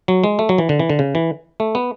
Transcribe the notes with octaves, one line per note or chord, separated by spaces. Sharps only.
F#3
G#3
A3
F#3
E3
D3
E3
D3
C#3
E3
A3
B3